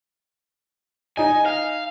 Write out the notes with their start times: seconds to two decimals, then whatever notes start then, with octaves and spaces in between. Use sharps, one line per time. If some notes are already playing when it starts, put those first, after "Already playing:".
1.17 D#4 D#5 G#5
1.46 F5